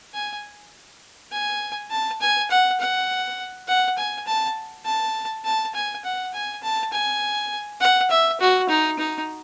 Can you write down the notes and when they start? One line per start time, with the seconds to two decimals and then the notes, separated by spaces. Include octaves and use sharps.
0.14 G#5
1.32 G#5
1.91 A5
2.21 G#5
2.50 F#5
2.80 F#5
3.68 F#5
3.98 G#5
4.27 A5
4.85 A5
5.45 A5
5.74 G#5
6.04 F#5
6.34 G#5
6.63 A5
6.92 G#5
7.81 F#5
8.10 E5
8.40 F#4
8.69 D#4
8.99 D#4